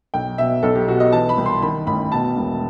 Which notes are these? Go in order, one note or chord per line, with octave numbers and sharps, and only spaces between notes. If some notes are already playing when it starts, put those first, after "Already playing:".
B1 G5
B2 E5
B1 A4
G4
B2 F#4
D#5
E3 A5
B5
C2
C6
D#3 B5
A1 B5
B2 A5
E1